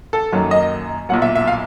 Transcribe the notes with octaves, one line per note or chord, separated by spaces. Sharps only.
A4
F#2 D#3 F#3 A#3
D#5
B1 A#2 F#3 F#5
E5
E5
F5